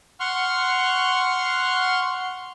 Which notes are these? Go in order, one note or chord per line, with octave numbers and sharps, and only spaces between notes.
F#5 C6 C#6 F6